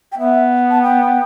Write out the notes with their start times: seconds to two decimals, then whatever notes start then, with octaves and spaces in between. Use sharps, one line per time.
0.12 G5
0.18 B3 E5
0.70 A5
0.82 G5